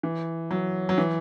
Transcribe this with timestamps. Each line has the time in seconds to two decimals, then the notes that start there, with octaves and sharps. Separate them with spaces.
0.03 E3
0.51 F#3
0.89 F#3
0.98 E3